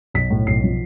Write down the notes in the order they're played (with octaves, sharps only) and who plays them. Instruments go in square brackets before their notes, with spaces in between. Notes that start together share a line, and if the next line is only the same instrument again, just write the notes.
[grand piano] B1 B6
A2
B1 C7
F3